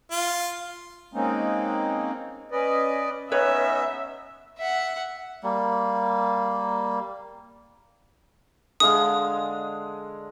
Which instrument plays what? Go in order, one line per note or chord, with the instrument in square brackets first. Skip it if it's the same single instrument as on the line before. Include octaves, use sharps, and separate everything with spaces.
[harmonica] F4
[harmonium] G#3 A#3 C4 C#4 D#4
C#4 B4 D5 D#5
[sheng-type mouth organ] B3 C#4 D#4 [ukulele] B4 C#5 [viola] E5
[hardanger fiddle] E5 F#5
[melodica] G3 A#3
[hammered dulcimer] D3 G#3 F5 [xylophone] D#6